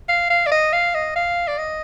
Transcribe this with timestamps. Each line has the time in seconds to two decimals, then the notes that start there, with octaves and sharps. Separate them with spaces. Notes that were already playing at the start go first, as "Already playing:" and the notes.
0.09 F5
0.30 F5
0.47 D5
0.52 D#5
0.73 F5
0.95 D#5
1.16 F5
1.48 D5
1.58 D#5